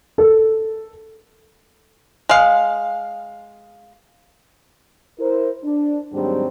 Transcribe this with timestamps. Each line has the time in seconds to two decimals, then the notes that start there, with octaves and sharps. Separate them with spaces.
0.18 A4
2.29 G#3 F5
5.19 E4 A#4 C5
5.64 D4
6.13 D#2 G#2 F#3 G3 C4 D4